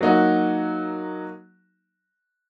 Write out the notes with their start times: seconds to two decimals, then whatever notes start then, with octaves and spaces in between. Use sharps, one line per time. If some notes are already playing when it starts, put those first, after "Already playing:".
0.01 F#3 A#3 D#4 F#4